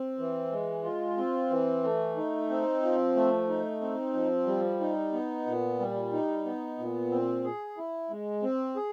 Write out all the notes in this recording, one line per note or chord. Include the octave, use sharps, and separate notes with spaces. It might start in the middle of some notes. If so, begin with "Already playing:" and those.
Already playing: C4
E3
G#3
F4
C4
E3
A3
D#4
C4
F3
A3
D#4
C4
F3
G3
D#4
B3
A#2
G3
D#4
B3
A#2
C4
G#4
E4
G#3
C4
G#4